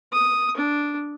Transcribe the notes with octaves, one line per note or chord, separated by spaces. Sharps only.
D#6
D4